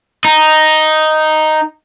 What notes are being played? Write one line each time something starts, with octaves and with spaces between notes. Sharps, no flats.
D#4